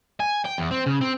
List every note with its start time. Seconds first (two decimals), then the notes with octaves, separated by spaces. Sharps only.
0.20 G#5
0.44 G5
0.58 E2
0.71 C4
0.86 C#3
1.02 C4